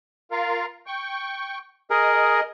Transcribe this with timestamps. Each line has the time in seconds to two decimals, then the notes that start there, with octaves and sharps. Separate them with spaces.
0.31 F4 A#4 F5
0.87 G5 C#6
1.90 G#4 A#4 D#5